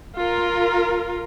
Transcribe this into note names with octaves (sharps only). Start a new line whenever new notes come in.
F4 A#4